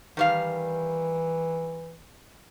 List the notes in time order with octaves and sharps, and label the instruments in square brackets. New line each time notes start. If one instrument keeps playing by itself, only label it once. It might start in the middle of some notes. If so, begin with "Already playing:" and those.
[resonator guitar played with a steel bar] D#3 G3 F5 [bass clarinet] E3